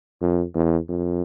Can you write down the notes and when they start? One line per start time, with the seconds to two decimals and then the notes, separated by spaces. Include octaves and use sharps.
0.21 F2
0.55 E2
0.89 F2